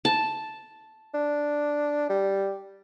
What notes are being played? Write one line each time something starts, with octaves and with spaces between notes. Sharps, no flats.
A5
D4
G3